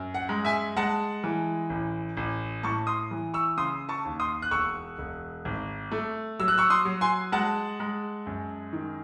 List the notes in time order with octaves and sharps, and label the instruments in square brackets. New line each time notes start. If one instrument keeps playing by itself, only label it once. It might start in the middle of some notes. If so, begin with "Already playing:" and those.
Already playing: [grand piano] F#2
F#5
G#3
E5 G#5
G#3 F#5 A5
E3
A1
A1
A2 A5 C#6
C6 D#6
E3
C#6 E6
C#3 C6 D#6
A5 C#6
D#2
C6 D#6
F#6
E1 C#6 E6
E1
G#1
A3
F#3 E6
F#6
C#6 E6
C6 D#6
F#3
G#5 C6
G#3 F#5 A5
G#3
F#2
D#3